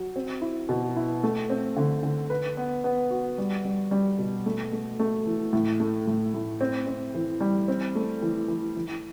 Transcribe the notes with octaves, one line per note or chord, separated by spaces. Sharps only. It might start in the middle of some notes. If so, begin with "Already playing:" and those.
Already playing: F#3
C4
E4
B2
E4
A3
C4
D3
D3
B4
B3
B3
F#4
G3
G3
G3
B2
A3
A3
A3
E3
A2
A3
A2
A2
C4
C4
E3
G3
C4
A3
E3
E3
E3